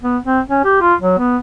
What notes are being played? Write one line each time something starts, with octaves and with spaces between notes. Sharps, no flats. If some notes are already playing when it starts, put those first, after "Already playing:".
B3
C4
C#4
G4
F4
F#3
B3